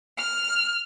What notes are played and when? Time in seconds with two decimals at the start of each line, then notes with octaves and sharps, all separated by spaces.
0.17 F6